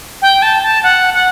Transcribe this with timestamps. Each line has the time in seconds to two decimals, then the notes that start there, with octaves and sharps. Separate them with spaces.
0.22 G5
0.42 A5
0.63 A5
0.83 F#5
1.14 F#5